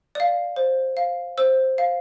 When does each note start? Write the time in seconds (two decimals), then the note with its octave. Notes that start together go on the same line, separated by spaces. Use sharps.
0.15 D5 F5
0.56 C5
0.97 F5
1.38 C5 E6
1.78 F5